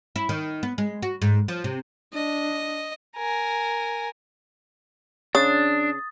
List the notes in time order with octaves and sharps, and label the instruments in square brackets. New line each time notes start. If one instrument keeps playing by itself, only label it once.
[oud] E4
D#3
B3
G#3
F#4
G#2
F3
C3
[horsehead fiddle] D4 [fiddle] D#5
[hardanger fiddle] A#4 G#5
[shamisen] C#3 [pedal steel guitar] D4 [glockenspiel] D#6 A6